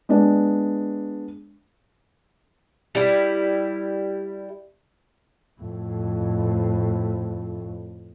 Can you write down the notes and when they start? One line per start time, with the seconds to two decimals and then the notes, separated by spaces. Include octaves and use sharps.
0.09 G#3 B3 D4 D5
2.95 G3 E4
5.61 F2 A2